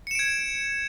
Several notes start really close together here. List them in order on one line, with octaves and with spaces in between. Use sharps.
C#7 E7 D7 G#6